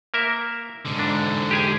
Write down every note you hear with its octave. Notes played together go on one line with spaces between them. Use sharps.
A#3 A#4 E5
G#2 D3
D4
G4 G#4 G#5